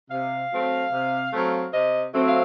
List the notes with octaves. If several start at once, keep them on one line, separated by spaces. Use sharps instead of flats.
C3 F5
F#3 A3 C4
C3
F#3 A3 C4
C3 D#5
F#3 A3 C4
F5